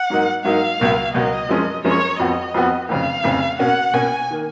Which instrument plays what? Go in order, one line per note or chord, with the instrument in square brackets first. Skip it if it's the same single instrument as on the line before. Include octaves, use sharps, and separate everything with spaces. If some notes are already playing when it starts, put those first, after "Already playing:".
Already playing: [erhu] F#5
[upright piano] G#2 F#3 A#3 D#4
[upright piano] G#2 F#3 A#3 D#4 [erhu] F5
[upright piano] C#2 B2 F#3 A#3
[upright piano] C#2 B2 F#3 A#3 [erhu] D#5
[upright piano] F#2 F3 G#3 C#4
[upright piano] F#2 F3 G#3 C#4 [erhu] C#5
[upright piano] F2 F3 B3 F#4 [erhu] D#5
[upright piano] F2 F3 B3 F#4
[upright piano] F1 F2 C#3 [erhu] F5
[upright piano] F1 F2 C#3
[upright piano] B2 A#3 C#4 F#4 [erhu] F#5
[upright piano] B2 A#3 C#4 F#4 [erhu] G#5
[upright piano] D#3 A#3